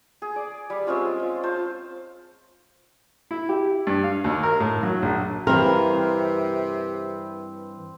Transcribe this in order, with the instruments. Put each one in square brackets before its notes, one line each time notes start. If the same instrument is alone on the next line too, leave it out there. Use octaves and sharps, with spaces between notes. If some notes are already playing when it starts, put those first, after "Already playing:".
[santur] G#4
D5
G3
G#3 C4 C#4 F4
F4
F4 C5 A5
[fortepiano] E4
G4
G2
F5
D#2
A#4
A2
F#3
A#1
[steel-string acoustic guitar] G2 E3 [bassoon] C3 [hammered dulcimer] C4 B4 F5 [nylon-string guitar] A#4